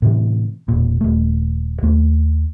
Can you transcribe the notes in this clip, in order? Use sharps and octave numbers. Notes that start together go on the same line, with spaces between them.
A2 C3 E3
E1 A#2
D#1 A3
D#2 A3